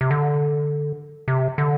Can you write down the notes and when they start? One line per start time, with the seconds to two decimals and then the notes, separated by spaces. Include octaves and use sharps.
0.01 C3
0.11 D3
1.28 C3
1.58 D3